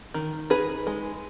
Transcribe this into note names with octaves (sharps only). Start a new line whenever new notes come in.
D#3
D#4 G#4 B4
G#3